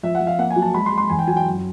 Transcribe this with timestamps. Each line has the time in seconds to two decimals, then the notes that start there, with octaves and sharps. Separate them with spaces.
0.03 F3 E5
0.15 F#5
0.20 F3
0.27 F5
0.39 A#3 F#5
0.50 G#5
0.56 F#3
0.62 A5
0.75 G#3 B5
0.86 C6
0.92 G#3
0.98 C6
1.10 E2 G#5
1.19 G5
1.27 F#3 G#5
1.37 G5
1.46 F#2